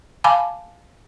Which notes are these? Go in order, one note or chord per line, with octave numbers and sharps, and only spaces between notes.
F5 G#5 A5 B5 D6